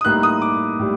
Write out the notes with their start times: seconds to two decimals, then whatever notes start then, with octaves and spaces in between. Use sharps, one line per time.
0.01 D#6
0.04 A2 G3 A#3 D#4 F#6
0.23 D#6
0.42 D6
0.80 A2 G3